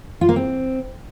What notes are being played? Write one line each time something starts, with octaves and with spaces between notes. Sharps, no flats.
F4
A#3
C4